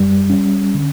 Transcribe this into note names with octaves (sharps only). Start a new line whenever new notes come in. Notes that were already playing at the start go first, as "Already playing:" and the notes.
Already playing: F#2 G3
C#4
D3